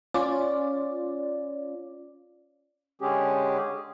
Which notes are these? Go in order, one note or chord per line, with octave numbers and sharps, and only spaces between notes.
C#4 F4 D5
D3 G#3 C#4 G4 G#4